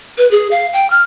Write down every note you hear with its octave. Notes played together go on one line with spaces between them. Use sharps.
B4
G#4
F5
G5
F6